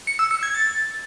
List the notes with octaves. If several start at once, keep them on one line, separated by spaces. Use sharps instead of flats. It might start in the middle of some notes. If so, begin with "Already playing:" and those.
C#7
E6
C#7
G#6
A6